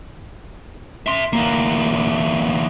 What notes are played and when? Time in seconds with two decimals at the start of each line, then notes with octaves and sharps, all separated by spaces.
1.07 E5 C6
1.33 E2 A#3